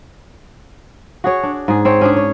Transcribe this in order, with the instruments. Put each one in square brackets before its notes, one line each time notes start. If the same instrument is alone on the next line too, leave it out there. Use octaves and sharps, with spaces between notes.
[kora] F#4 G#4 C#5
D4
G#2 G#4
C4 C5 C#5
C#4 D4 G#4
C#5